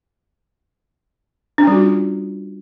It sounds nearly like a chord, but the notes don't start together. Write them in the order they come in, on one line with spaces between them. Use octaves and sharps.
D4 C#4 G3 F#4 F4